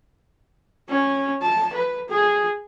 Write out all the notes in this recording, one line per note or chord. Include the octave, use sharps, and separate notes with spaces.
C#4
A5
B4
G#4